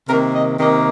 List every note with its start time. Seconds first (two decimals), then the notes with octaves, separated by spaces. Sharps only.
0.07 C3 D#3 A#3 A#4
0.33 D#5
0.58 C3 D#3 A#3 D#5